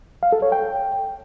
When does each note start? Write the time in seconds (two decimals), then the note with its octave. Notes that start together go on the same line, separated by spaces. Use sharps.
0.23 F5
0.32 A4
0.42 C#5
0.52 G5